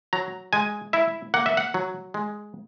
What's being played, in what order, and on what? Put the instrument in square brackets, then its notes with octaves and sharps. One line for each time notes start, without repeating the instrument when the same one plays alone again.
[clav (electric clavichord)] F#3 A#5
G#3 G#5
E4 E5
A#3 F#5
E5
F#5
F#3
G#3